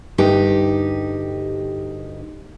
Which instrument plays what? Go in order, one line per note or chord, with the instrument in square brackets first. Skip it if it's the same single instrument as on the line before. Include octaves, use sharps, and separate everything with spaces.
[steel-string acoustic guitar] D2 G2 D#4 G4